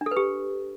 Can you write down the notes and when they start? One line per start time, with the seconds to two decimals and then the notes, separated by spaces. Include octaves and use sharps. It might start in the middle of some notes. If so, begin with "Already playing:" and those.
0.01 D4
0.06 A4
0.11 B4
0.17 G4